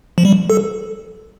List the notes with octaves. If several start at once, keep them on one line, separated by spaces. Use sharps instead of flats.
F3
G3
A4